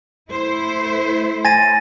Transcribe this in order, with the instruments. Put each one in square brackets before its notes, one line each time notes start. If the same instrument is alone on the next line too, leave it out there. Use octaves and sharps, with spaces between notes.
[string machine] A3 [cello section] E4 C5
[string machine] C#5 E5 B5 [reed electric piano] G#5 [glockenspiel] A6 A#6 D#7